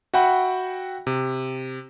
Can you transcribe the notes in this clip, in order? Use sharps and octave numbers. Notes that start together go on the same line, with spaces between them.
F#4 E5 F#5 G5 B5
C3